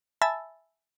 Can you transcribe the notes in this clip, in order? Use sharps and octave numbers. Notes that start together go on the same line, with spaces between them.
E5 G#5 A5 B5 E6 A6